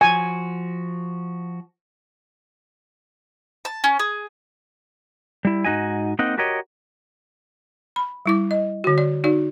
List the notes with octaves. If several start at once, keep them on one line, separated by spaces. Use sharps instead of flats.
F3 F#4 G#5
A5
C#4
G#4
G3 E4
G#2 D#4 F#4 D#5 G#5
A#3 C4 D#4 D#5 F#5
F#4 G4 A#4 C#5 D#5
B5
G3 E4 D6
D#5
D3 F#4
D5
D#4 F#4 D5